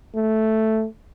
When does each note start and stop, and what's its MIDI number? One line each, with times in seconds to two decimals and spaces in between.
0.16 0.86 57